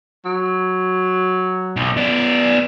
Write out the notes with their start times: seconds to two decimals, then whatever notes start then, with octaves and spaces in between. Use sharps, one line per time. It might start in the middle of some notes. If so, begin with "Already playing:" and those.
0.25 F#3
1.77 B1
1.97 B3 D5